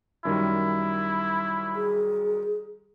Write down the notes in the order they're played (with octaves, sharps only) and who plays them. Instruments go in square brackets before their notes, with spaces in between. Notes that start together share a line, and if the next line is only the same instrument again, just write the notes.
[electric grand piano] F#2 D#3 G3 [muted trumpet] E4
[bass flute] G#4